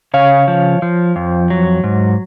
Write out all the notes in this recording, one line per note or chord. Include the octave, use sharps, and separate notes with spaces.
C#3 C#5 F5
F3
F3
F2
F#3
G#2